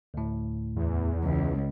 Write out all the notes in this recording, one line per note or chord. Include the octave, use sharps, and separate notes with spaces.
D2 A2
E2
C#2